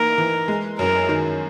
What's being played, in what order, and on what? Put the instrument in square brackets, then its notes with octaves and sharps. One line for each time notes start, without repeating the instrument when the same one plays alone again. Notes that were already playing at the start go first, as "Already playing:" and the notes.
Already playing: [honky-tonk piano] E3 A#3 D#4 [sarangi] A#4
[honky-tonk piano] E3
G#3
[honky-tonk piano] F#2 [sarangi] A#4
[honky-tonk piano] D#3